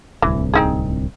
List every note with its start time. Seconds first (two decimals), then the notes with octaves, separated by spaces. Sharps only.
0.22 D1 C2 E3
0.54 C4 D#4 G#4